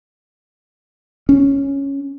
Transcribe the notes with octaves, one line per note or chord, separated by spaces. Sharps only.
C#4